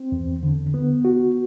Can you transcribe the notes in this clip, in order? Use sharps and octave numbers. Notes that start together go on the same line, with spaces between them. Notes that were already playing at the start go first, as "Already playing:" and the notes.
Already playing: C4
E2
D3
B3
F#4